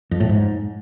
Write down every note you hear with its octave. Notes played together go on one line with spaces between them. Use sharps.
F2
A2
G#2